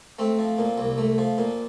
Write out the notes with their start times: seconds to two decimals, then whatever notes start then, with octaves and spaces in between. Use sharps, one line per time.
0.19 A3 C4
0.39 F3
0.58 A#2
0.78 C2
0.98 A3
1.18 F3
1.38 A#2